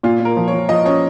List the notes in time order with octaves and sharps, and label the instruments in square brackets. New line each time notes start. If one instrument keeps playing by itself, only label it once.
[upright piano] A#2 [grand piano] F4
[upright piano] A#2
[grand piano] A#4
[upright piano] F3
[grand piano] C#5
[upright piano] F3
[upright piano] F3 [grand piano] D#5
[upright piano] C#4 [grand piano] C#5